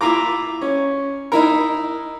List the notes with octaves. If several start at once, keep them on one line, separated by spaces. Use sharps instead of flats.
E4 F4 A#5 D6
C#4
D#4 E4 A#4